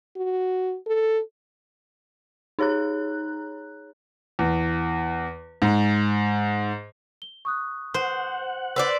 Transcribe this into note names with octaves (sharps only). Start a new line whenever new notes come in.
F#4
A4
D#4 G#4 C#5 A#5 F#6
E2
G#2
G7
C#6 D#6 F#6
C5 F#5
B4 C5 D5 E6